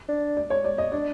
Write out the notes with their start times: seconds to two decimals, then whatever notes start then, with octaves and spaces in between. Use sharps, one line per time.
0.09 D4
0.37 D5
0.50 C#5
0.64 D5
0.78 D#5
0.92 D4 D5